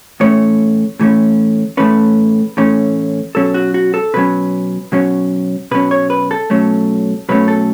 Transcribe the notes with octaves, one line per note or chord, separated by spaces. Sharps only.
A2 E3 A3 C#4 C#5
A2 E3 A3 C#4
A2 E3 A3 C#4 B4
A2 E3 A3 C#4
B2 F#3 C#4 A4
F#4
F#4
A4
B2 F#3 C#4 B4
B2 F#3 C#4
B2 F#3 C#4 B4
C#5
B4
A4
B2 F#3 A3 C#4
B2 F#3 A3 C#4 B4
A4